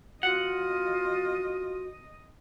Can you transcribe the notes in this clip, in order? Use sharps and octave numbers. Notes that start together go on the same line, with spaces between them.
F4 F#4 D#5 F#5